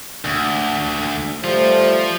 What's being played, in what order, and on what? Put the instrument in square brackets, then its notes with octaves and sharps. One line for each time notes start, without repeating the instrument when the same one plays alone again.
[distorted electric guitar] D2
[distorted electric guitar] F3 F4 [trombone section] G3 A3 C5